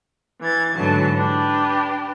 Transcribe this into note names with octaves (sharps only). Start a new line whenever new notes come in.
E3 G#6 A6
G#2 D3 E3 F#3 A5
D4 G4 B4